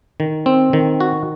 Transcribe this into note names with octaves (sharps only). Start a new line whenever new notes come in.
D#3
C4
D#3
F#4